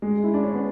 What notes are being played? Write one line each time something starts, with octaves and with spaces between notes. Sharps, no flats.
G#3
E4
D4
C#4
B3